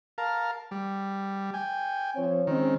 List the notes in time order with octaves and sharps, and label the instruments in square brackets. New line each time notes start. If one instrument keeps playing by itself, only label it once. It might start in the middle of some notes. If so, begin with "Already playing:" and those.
[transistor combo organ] A#4 F5 A5
G3
G5 G#5
[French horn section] F3 C4 C#5
[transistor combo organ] D#3 [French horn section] G#3 C4 C#4